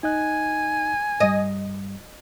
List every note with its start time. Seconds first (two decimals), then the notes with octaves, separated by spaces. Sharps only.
0.03 D#4 D#5 G#5 F#6
1.20 G2 G3 D#5